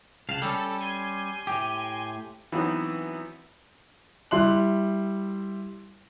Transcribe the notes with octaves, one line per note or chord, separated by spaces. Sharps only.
C#2 F5 A5 F#6
G3 C#4 A4
G#5 C6
A2 G4
E3 F#3 B3 C4 D#4 F#4
G3 E4 C6 F#6 F#7